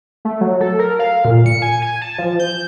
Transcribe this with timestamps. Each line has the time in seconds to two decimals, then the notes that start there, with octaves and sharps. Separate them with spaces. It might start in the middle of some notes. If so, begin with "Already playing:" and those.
0.25 A3
0.41 F#3
0.61 A4
0.79 A#4
0.99 F5
1.25 A#2
1.46 C#7
1.62 G#5
1.82 G#5
2.02 A5
2.19 F3
2.39 G6